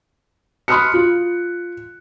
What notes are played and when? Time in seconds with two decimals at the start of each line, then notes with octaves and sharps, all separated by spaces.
0.68 B5 C6 D#6 F6 F#6 C#7
0.94 F4